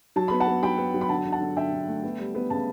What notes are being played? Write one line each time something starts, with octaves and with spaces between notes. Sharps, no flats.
F#3 A5
B3 B5
F#5 A5
B3
F#3 G5 B5
B3
F#3
B5
D3 F#5 A5
D3
F#5 A5
D3
D3 E5 G5
D3
A3
B3
G3
B3
C#3 A5